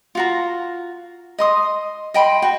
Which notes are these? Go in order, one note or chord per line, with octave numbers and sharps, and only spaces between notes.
F4 F#4 A#5
D#5 C6 D#6
D#5 G5 B5 C6
F#4 G5